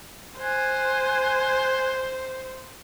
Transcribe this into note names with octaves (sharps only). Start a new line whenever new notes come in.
C5 G#5 F#6 G#6